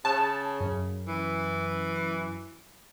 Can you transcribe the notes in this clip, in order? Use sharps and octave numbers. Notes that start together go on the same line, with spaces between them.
C#3 A5
F#2
E3